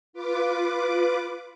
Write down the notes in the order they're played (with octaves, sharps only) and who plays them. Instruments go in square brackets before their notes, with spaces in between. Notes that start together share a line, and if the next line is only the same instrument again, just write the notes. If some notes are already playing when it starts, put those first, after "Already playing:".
[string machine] F4 B4 D6